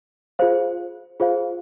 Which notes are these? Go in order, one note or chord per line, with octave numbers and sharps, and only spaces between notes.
F4 G#4 C5 F5
F4 G#4 C5 F5